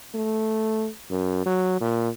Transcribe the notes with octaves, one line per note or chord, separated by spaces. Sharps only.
A3
F#2
F#3
A#2